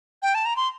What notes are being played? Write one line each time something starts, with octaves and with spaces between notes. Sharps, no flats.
G5
A5
A#5
C6